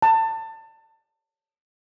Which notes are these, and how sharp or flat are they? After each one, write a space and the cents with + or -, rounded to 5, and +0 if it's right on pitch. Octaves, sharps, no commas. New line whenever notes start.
A5 +30